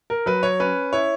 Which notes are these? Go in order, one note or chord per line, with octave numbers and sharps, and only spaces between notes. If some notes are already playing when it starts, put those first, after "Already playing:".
A#4
F#3 B4
C#5
C#4 B4
E4 C#5